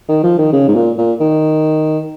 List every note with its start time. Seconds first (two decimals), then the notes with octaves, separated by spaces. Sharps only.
0.09 D#3
0.23 F3
0.38 D#3
0.53 C#3
0.68 G#2
0.75 A#2
0.98 A#2
1.21 D#3